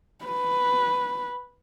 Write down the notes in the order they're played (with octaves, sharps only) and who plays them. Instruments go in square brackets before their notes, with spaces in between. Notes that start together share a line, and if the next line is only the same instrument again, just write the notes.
[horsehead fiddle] B4